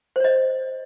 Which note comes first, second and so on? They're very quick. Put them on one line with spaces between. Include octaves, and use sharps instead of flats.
C5 C#5 D#5